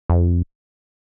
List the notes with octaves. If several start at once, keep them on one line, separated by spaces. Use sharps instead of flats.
F2